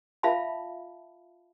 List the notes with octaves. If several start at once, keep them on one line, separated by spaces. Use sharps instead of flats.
F4 E5 F5 A5 B5